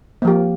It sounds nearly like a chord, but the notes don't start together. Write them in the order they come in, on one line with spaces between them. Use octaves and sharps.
A#3 F3 G4